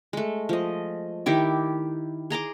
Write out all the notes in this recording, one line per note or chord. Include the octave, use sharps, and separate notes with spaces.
G#3 A3
F3 D#5
D#3 E4 G4 D6
G#4 A#5 C6 D6